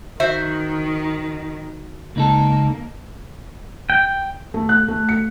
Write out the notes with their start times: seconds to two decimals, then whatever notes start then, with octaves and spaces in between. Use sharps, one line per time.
0.20 D#3 F#4 C5 E5
2.16 C#2 A#3 D#4 A4
3.90 G5
4.54 A3
4.69 F#6
4.88 A3
5.09 C#7